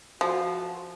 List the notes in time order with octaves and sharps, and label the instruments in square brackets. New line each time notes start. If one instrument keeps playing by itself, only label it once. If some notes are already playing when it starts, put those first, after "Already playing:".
[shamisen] F3 [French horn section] F#4